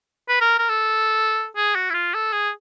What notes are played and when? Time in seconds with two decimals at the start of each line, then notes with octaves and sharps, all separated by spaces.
0.29 B4
0.41 A#4
0.59 A#4
0.69 A4
1.56 G#4
1.75 F#4
1.90 E4
1.94 F4
2.14 A4
2.33 G#4